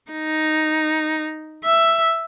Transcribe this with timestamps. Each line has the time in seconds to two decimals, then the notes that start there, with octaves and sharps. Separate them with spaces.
0.12 D#4
1.64 E5